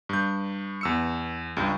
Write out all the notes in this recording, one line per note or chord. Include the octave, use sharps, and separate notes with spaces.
G2 G6
E2 E6 C#7
C#2 G2